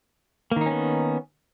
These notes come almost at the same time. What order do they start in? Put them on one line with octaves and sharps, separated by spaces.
A#3 D#3 D#4 C#4 B3